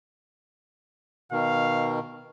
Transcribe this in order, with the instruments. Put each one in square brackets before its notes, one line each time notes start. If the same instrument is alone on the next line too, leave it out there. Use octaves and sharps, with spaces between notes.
[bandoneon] B2 D#3 [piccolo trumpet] F5